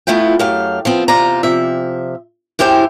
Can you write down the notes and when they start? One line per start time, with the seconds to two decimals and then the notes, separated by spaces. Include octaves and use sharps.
0.07 F2 A3 B3 E4 F4 G5
0.39 F#2 F#3 A3 G4 F5
0.85 F3 B3 C4
1.08 E2 C3 F4 C5 D5 A#5
1.43 C3 F3 E5
2.59 F#2 E4 G4 C5 G5